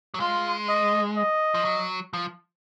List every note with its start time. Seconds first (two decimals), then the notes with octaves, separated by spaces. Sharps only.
0.14 F#3
0.20 G#3 F4
0.69 D#5
1.17 D#5
1.54 F3
1.65 F#3
2.13 F3